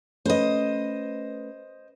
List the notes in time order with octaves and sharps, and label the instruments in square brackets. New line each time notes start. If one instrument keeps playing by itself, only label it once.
[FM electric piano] A3 C#4 B4 [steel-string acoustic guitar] C5 D#5